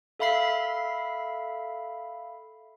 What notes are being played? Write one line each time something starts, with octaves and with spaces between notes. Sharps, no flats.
A4 E5 F5 B5 B6 C7